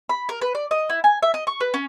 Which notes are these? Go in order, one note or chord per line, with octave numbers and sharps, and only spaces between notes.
B5
A#4
B4
D5
D#5
E4
G#5
E5
D#5
C#6
B4
C#4